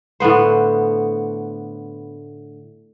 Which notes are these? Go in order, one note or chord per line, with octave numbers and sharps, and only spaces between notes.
A2 D3 B3 C5